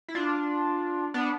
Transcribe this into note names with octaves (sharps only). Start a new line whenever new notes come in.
E4
D4 F4
B3 D4